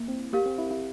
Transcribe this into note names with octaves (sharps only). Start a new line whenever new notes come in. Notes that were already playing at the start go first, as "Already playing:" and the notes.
Already playing: A#3 E4
C4
A#3 G4 A#4 F5
C4
E4
E4